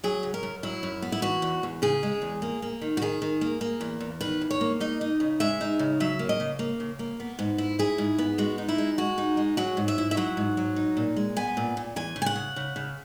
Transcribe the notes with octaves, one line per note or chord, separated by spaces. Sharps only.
F#3 G#4
C#3
A#4
F#2
F#3 E4
F#2
B3
E4
E3 F#4
E2
E2
C#3 G#4
G#3
E2
A#3
A#3
D#3
F#4
D#3 G#4
D#3
A#3
A#3
E2
E2
D#3 B4
E2
C#5
A#3
D#4 D#5
D#4
C#3
G#3 E5
D#4
C#3
F#3 E5
A#3
D#5
C#3
A#3
C#3
A#3
B3
G#2
E4
E4 G#4
G#2
B3
G#3 F#4
D#4
E4
G#3
G#3 F#4
D#4
G#3
F#3 F#4
G#2
E5
E4
E5
F#3 F#5
G#2
F#3
D#4
A#2
G#3
B3 G#5
A#2
A#2
E2 G#5
C#3
G#5
F#5
C#3
C#3
C#3